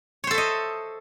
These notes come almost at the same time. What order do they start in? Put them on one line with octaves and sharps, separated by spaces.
C#5 C5 A4 E5 D#5